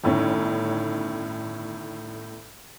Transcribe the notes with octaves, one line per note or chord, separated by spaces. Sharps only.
G1 A2 D#3 C#4